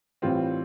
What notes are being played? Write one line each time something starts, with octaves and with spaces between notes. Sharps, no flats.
A2 E3 G3 C4 F4